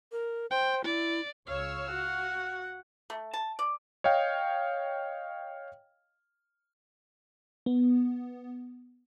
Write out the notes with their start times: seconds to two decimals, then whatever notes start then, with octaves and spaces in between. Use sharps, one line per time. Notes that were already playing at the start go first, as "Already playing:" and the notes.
0.12 A#4
0.51 C5 G5
0.84 E4 D5
1.47 C#2 C#5 F5 E6
1.90 F#4 F#5
3.10 A3
3.33 A5
3.59 D5
4.04 C#5 D#5 F5 G5
7.66 B3